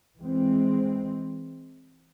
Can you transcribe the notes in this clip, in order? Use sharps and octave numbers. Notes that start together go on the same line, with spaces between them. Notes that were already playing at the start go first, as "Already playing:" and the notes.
E3 G#3 C4